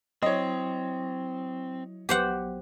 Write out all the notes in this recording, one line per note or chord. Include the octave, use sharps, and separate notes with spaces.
F#3 C4 E4 C#5 D#5
A#1 F#3 B3 G4 C5 F#5